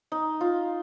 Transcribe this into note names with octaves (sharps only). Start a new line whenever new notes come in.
D#4
F4